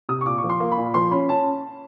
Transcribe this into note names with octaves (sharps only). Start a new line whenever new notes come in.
C3 D#6
C#6
A#2 D6
C#6
F3
C6
A#3
B5
A#2
F3 C6
C#4 B5
C#4 A5